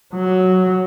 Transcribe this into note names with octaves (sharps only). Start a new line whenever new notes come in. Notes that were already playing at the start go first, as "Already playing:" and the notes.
F#3